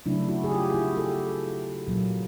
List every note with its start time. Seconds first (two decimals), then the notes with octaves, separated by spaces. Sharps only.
0.06 C#3 F#3 A3 D4 E4
0.28 E4 F#4
0.44 G#4
0.51 F4 G4
0.74 E4 F#4
0.97 G4 A4
1.88 A#2 F#3 A#3